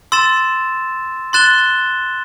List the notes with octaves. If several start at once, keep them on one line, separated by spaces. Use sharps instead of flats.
C6 E6 A6 E7
C6 F#6 A6 E7 G7